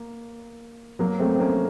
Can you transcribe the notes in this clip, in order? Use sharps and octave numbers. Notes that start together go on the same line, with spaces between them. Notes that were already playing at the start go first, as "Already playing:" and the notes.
Already playing: A#3
F#3 A#3
A3 C4
C4
A#3 C#4